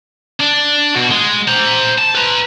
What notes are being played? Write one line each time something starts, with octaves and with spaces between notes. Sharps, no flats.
D4
B2 F#4
G#3
C5 A#5
A5
B4 A#5